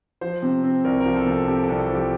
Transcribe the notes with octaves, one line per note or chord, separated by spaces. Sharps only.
F3 C5
C3
C4
C2 A#4
A#4
F3
A4
C3
A4
C4 G4
A4
C2
A4
F3
G4